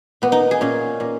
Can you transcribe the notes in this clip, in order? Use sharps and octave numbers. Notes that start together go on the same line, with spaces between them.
A#2 B3
D#4
G#4
A#2 C#4
A#2